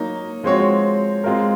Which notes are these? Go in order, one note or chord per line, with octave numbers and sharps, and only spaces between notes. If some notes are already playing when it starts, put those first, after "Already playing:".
Already playing: F#3 A#3 D#4
F3 G#3 C4 F#4 C#5
G#3 C4 F4 A#4